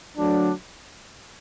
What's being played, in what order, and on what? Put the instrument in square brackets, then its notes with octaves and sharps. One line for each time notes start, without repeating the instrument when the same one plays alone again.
[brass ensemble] D3 F#3 A3 D4